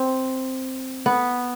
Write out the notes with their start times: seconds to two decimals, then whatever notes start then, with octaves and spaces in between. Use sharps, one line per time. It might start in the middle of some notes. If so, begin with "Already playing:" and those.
Already playing: C4
1.06 B3